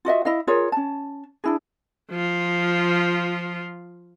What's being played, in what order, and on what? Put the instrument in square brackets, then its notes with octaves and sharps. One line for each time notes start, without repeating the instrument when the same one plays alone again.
[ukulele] F4 F#4 D#5 E5
E4 D#5 F5
F4 G#4 A#4 C#5
C#4 A5
D4 E4 G#4
[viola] F3 F4